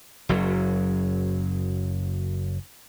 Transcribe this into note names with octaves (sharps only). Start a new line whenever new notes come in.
F#1 F#2 F#3